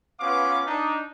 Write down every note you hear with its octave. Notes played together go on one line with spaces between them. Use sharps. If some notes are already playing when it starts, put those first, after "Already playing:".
B3 C#4 F4 B4 F5 D6
D4 D#4